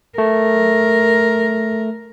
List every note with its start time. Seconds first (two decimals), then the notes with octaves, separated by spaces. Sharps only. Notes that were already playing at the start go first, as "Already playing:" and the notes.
0.18 A3 A#4